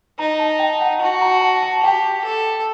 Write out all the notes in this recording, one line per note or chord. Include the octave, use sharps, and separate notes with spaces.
D#4 A#5
A5
G5
F#5
F#4 A5
A#5
A5
A5
G4 G5
A4